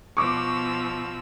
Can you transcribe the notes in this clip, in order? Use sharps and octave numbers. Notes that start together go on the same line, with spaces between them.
B2 F3 C#6 D6 E6